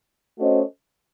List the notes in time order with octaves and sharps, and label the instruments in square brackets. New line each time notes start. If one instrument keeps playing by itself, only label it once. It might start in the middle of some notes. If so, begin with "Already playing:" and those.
[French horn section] A3 C#4 F#4 C5 D#5